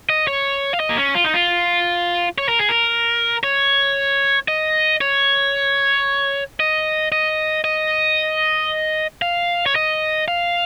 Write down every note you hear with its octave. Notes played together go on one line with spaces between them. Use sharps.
D#5
C#5
F5
D#5
A#3
C#4
F4
D#4
F4
C#5
A#4
G#4
A#4
C#5
D#5
C#5
D#5
D#5
D#5
F5
C#5
D#5
F5